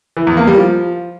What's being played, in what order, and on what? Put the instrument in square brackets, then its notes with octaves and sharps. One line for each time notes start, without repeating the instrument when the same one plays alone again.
[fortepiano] E3
E2
A#3
G3
F3